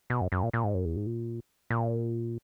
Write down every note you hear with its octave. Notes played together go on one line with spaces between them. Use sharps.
B2
F#2
F#2
A#2
A#2
G#2
F#2
E2
G#2
A#2
A#2